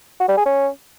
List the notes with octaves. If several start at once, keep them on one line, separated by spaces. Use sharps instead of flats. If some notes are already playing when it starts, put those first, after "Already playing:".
F#4
G3
G#4
C#4